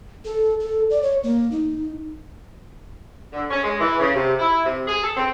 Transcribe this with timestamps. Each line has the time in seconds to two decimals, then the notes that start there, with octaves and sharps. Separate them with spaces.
0.25 A4
0.60 A4
0.90 D5
1.02 C#5
1.24 A#3
1.52 D#4
3.33 D3
3.50 C#4
3.64 G#3
3.80 E3
4.00 C#3
4.15 C3
4.39 E4
4.65 C3
4.87 G#4
5.04 A4
5.17 C4